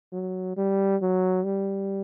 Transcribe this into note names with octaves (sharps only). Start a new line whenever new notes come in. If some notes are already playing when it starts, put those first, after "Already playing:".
F#3
G3
F#3
G3